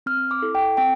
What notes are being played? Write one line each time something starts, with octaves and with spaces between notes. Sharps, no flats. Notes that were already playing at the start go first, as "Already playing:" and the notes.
C4 F6
D6
E4 A4
G5
C4 G5